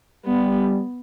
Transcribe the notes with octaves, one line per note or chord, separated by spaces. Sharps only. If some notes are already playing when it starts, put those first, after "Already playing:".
G3 B3